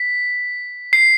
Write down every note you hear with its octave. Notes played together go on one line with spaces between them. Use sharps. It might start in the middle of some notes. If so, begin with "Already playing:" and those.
Already playing: B6
C7